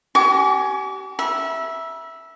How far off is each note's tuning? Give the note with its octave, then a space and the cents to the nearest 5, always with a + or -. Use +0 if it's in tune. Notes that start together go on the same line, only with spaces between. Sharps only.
G4 -35 G#5 +20 C#6 +40
E5 +0 B5 -40